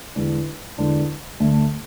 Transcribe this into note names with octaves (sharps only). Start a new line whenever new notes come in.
E2 D3 G#3 D4
E2 D3 G#3 D4
D2 D3 A3